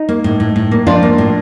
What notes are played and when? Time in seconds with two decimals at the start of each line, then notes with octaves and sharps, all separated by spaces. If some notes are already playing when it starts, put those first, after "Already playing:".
Already playing: D#4
0.09 A#3
0.24 A2
0.40 A2
0.56 A2
0.71 A#3
0.87 F3 D4 F4
1.03 A#3
1.18 A2